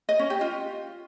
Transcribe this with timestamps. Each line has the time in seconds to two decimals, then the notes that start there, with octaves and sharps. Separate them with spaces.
0.09 D#5
0.19 C#4
0.30 G4
0.41 F4